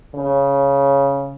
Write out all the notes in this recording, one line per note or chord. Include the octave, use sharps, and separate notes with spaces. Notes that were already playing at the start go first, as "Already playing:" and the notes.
C#3